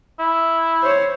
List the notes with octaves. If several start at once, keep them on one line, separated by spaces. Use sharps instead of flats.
E4
C5 C#5